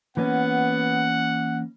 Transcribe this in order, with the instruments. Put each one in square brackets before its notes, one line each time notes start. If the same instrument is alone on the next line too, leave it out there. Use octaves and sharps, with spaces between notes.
[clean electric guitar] E3 A#3 C#4 [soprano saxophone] B3 [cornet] F#5